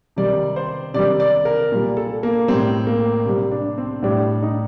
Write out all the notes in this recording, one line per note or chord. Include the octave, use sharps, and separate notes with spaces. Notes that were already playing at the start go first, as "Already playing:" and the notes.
C3 D#3 G3 D5
C5
C3 D#3 G3 D5
D5
A#4
A#2 G3
A4
A#3
A2 G3 C4
A#3
C3 G3
D4
C4
A2 G3 D4
D#4